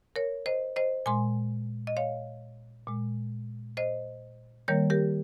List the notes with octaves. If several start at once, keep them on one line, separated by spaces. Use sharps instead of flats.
A#4 C#5
C5 D#5
C5 D#5
A#2 G#3 G#5 C6
D#5
C#5 F5
A#2 G#3
C5 D#5
D#3 G3 A#3 A#4 C#5
G4 A#4